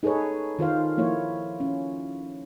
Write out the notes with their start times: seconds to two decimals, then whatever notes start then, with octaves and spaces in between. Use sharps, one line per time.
0.03 D#4 G#4 A4 B4 C#5
0.59 D#3 F4 C5 F5
0.97 F3 A#3 E4 C#5
1.60 C#4